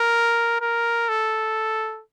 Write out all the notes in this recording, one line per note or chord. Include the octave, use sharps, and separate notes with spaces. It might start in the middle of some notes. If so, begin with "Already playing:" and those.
Already playing: A#4
A#4
A4